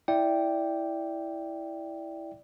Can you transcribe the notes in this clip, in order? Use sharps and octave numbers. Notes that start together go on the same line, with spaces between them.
E4 D5 E5 G5